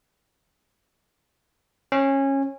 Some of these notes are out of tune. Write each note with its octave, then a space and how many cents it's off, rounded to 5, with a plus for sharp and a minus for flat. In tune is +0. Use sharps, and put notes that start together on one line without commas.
C#4 -20